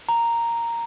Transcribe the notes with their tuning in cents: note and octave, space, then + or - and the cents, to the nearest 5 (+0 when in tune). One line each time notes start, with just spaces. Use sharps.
A#5 -5